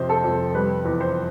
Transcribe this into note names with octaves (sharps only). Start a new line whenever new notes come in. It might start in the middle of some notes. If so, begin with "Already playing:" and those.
Already playing: F2 C3 C5
A4
F2
G3 B4
E2
C5